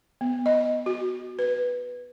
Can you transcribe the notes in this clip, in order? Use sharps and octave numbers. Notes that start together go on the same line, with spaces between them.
B3
D#5
F#4
B4